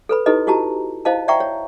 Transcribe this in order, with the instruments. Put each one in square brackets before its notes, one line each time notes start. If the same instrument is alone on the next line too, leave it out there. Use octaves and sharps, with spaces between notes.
[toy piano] A4 B4 B5
D#4 E4 G4 A4 B4 D#5
E4 F#4 G4 A5 A#5
E4 C5 D#5 F5 A5
D5 E5 F#5 G5 A#5 C#6
C#5